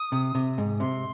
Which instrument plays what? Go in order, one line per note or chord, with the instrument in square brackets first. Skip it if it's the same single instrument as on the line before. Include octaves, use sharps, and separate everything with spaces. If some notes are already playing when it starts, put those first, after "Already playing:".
Already playing: [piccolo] D#6
[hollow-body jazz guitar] C3
C3
G#2
[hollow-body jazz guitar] C3 [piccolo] C6